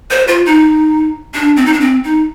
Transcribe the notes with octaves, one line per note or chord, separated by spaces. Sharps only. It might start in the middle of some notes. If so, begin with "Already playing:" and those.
C5
F4
D#4
D4
C4
D#4
D4
C4
D#4